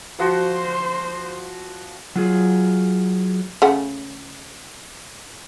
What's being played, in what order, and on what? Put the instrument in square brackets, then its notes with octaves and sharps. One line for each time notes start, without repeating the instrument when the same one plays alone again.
[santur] F3 F#4 [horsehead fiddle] C5
[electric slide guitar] F#3 F4 G#4
[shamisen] C#3 A3 F#5